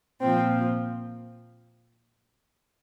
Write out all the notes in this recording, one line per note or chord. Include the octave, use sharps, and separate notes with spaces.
A#2 F3 C4